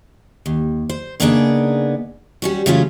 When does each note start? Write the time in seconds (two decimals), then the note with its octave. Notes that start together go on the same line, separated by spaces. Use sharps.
0.46 D#2
0.89 C5
1.20 C#3 A#3 B3 D4 D#4 G#4
2.42 G3 C#4 F#4
2.66 C#3 E3 F#3 A3 C#4 F4